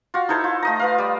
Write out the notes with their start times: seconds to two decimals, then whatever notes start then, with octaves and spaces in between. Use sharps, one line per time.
0.14 F4 F#4
0.29 D#4 E4 A4 C5
0.44 F4
0.63 A3 D#5 A#5
0.79 F4 B4 F5
0.98 G3 D#6